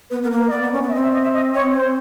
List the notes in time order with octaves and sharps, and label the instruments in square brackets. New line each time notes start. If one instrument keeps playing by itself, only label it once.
[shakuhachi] B3 [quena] B4
[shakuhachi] B3 [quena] A#4
[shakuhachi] A#3
[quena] B4
D#5
[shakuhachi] B3 [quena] D5
[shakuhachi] B3
C#4
B3
[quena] E5
[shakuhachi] C4 [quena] D#5
[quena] E5
D#5
E5
D#5
C#5
C5